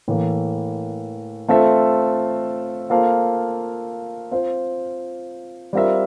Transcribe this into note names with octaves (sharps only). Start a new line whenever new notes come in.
A2 E3 A#3
A3 C4 F4 A4 E5
A#3 F4 A4 C5 F5
C4 F4 C5
G3 C4 F4 A#4 E5